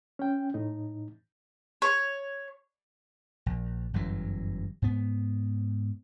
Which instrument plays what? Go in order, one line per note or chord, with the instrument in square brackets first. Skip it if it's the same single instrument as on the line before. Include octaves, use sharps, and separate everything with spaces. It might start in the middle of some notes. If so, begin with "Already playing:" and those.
[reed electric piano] C#4 G5
A2 D#4
[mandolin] C#5
[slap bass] A#1
G1 F#2 E3 F#3
G#2 B3